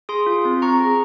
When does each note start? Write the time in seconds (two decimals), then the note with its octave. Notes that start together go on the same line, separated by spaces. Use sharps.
0.09 G#4 C6 D#6
0.26 F4
0.45 C4
0.62 C4 A#5 C#6
0.80 G#4